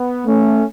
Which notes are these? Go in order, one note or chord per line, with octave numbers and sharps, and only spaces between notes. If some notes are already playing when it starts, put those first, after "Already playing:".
Already playing: B3
A3 C#4